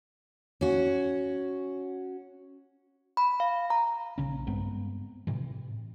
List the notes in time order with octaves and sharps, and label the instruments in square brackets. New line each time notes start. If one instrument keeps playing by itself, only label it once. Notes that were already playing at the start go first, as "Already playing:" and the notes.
[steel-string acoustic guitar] C#4 F#4
[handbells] B5
F5
A#5
[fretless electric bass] A#1 C#3 C#4
G2 G#3 B3 C4
A2 C3 E3